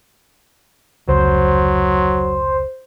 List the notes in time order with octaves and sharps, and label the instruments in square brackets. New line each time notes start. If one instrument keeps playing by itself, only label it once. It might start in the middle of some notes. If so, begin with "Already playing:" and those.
[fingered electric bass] F1 C#2 [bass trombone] F#3 [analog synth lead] C5